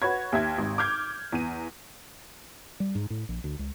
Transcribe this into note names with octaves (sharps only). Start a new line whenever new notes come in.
F#4 B4 C#5 G#6
D#2 E5 G#6
G#1
D6 F6 G6 G#6
E2 D#7
G3
G#2
A2
A#1
D2
C#2